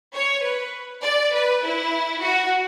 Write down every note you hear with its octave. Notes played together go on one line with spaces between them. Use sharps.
C#5
B4
D5
B4
E4
F#4